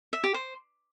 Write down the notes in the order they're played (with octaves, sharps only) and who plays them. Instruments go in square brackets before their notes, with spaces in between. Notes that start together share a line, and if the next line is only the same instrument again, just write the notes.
[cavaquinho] E5
G4
C5